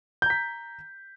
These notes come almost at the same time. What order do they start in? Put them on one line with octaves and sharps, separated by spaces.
G6 A#5 B6